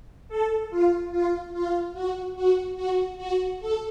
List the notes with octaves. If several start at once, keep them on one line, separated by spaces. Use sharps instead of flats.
A4
F4
F4
F4
F#4
F#4
F#4
F#4
A4